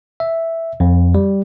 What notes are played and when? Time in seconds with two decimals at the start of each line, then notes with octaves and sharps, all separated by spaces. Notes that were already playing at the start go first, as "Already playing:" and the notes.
0.20 E5
0.80 F2
1.15 G3